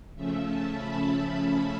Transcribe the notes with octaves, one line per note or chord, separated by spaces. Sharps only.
C#3 F3 A3 C#4 E5
A5
B5